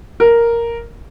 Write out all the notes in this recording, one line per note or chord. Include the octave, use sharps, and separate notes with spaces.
A#4